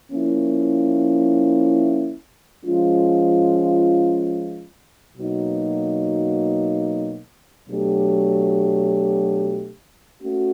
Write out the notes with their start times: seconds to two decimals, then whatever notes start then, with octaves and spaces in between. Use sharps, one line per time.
0.11 F3 A#3 C#4 E4
2.64 F3 G#3 C#4 F4
5.17 B2 F#3 A#3 D#4
7.69 B2 F#3 A3 D4 G4
10.22 A3 C#4 F#4